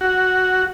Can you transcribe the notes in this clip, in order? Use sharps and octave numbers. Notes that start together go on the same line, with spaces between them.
F#4